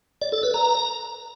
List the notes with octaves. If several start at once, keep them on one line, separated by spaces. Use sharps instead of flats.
D5
A4
B4
A#5